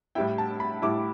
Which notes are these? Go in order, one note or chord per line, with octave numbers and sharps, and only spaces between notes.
A2 G3 E4 G5
A5
B5
A2 G3 E4 D6